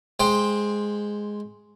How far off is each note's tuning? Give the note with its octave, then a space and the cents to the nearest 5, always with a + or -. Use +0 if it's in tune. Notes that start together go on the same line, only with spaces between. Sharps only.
G#3 +0 C5 +0 G5 +15